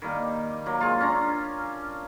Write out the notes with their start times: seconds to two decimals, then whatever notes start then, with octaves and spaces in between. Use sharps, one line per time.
0.02 D#3 G3 A#3
0.66 F#3 A#3
0.81 G#3 F4
1.00 C#4 D4 A#5